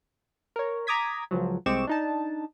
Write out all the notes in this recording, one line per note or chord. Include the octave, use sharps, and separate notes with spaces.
A#4 C#5
A#5 D6 D#6 G#6 B6
C#2 F3 F#3
C2 G#3 C4 C#6 D6 E7
D4 D#4 A5